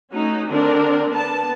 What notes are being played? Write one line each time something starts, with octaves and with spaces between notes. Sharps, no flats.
A3 C#4 D#4 F#4
D3 C4 D4 A#4
B3 A5